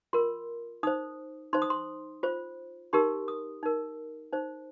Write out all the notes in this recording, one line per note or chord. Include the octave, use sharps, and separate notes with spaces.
F4 A#4 C6
D#4 C5 D#6
D#4 C5 C6
D#6
C6
F4 C5
D#4 G4 A#4 C6
D#6
D#4 A#4
D#4 C5